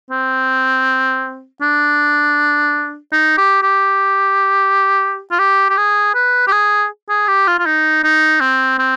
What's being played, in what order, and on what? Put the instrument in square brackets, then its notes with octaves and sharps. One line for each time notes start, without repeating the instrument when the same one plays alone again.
[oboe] C4
D4
D#4
G4
G4
F4
G4
G4
G#4
B4
G4
G#4
G#4
G4
F4
F4
D#4
D#4
C4
C4